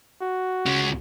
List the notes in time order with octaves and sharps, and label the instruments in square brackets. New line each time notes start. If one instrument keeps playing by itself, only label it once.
[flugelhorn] F#4
[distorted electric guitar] C#2 C#4